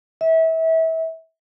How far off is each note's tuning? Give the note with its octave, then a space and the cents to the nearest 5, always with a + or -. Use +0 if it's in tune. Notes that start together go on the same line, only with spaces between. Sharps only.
E5 -30